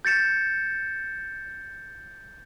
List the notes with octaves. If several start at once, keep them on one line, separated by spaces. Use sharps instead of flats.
G6 A6 C#7 E7